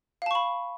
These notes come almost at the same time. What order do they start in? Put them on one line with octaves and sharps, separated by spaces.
F5 A5 C#6 B5